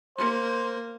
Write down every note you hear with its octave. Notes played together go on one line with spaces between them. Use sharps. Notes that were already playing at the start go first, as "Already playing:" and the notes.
A#3 C5